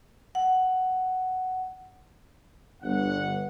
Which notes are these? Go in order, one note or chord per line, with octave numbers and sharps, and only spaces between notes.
F#5
G1 F#5